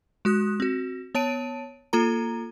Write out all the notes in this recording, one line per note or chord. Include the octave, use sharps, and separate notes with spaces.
G#3 F#4 D#6 F#6
C4 F#4
B3 C#5 A5 D7 D#7
A#3 F4 A4 A#5